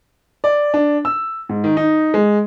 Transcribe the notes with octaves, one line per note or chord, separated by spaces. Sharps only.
D5
D4
E6
G#2
D#3
D#4
G#3